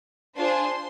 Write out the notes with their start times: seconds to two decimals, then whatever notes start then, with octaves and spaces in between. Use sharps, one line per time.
0.36 D4 F4 G#4 C5 C6